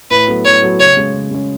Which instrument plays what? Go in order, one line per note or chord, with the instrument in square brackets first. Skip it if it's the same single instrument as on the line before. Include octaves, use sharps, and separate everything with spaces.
[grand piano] A2 [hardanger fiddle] B4
[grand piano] F#3 B3 F#4 A4
[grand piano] A2 [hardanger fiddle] C#5
[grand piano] F#3 B3 F#4 A4
[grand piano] C#3 [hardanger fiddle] C#5
[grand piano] G#3 C#4
C#3
G#3 C#4